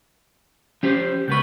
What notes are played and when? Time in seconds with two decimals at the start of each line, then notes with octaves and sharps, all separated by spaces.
0.83 F3 C#4 G4 C5
1.28 C#2 B3 B4 C#6 G6